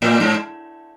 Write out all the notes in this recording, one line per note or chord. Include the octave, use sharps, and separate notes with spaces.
A2
G#2